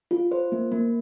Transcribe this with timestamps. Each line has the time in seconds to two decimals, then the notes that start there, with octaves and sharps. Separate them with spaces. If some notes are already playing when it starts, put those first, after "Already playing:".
0.11 F4
0.31 C5
0.52 A#3
0.72 A#3